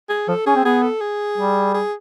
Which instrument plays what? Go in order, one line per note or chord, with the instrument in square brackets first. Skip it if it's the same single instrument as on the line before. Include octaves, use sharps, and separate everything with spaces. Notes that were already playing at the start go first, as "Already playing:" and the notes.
[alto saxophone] G#4
[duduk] F3 [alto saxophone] A4
[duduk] C#4 [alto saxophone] G#4
[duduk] C4
[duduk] B3 [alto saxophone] G#4
[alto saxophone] A4
G#4
[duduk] G3
[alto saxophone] G#4